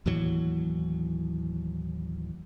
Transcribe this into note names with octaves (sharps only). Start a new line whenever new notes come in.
D#2 A2 E3 F#3